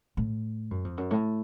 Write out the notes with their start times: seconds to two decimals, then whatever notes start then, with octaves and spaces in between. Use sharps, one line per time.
0.17 A2
0.71 F#2
0.85 F2
0.97 F#2
1.11 A2